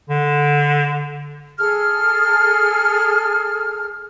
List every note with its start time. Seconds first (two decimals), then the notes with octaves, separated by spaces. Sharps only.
0.10 D3
1.58 G#4 A4 F6